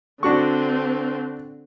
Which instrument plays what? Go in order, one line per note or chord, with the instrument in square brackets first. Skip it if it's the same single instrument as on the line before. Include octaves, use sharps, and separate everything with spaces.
[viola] D3 C4 [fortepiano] D4 F#4 C#6